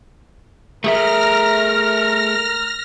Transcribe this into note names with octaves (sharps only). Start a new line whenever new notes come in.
A3 G#4 A#4 E5 F6 A#6